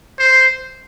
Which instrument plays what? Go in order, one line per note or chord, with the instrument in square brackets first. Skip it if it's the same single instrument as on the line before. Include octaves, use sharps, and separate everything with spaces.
[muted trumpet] C5